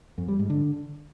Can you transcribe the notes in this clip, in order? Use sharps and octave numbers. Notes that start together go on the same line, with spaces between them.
F2
G3
G#2
D3